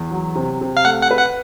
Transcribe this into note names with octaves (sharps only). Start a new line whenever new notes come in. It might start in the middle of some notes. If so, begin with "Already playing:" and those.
Already playing: E2
F#3
C3
C3
F5
A3 F#5
F#5
B4
F#5